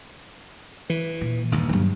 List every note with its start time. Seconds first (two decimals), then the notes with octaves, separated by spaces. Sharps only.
0.90 E3
1.21 A#2
1.52 G1 D#2
1.69 G2 F#3